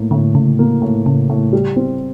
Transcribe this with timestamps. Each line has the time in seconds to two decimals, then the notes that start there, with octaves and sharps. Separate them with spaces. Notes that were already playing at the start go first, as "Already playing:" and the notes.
Already playing: A2 A#3
0.11 A2 D3
0.35 A2 C#3
0.59 A#3
0.82 A2
1.06 A2 C#3
1.30 A2
1.53 G3
1.76 C4